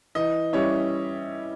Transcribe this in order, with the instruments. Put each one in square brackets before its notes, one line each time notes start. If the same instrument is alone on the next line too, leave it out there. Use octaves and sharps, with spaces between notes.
[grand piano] E3 [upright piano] D#5
[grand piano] G3 C#4 E4 [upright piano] C#5